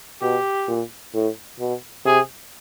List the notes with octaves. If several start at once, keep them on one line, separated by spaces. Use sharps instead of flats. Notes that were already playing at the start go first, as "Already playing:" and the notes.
B2 G4
A#2
A2
B2
C3 G#4